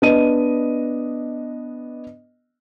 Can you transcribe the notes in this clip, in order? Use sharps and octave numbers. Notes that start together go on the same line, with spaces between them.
B3 D4 D#5 D#7